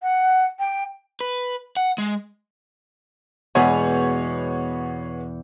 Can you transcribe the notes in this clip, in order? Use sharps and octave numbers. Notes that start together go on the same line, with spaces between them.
F#5
G5
B4
F#5
G#3
E2 B2 G#3 B3 G#4 C#5